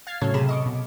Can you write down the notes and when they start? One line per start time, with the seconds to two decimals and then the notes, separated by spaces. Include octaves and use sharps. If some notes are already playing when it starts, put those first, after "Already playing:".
0.07 F5 F6 G#6 A6 C7
0.21 A2 C#3 F#3 A4 C#5 G#6
0.34 C3 G#4 B5 E7
0.49 D#5 C#6 D6
0.66 B2